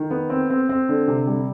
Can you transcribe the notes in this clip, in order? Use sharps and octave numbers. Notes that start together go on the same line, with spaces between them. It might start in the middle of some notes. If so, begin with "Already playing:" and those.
Already playing: D#3
B3
C4
C4
C4
D3
C3
G3